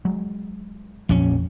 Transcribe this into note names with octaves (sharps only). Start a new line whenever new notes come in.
F#3 G#3
A#1 F2 F3 C#4